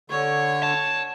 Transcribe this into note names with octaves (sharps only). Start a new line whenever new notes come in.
D3 C#5
A5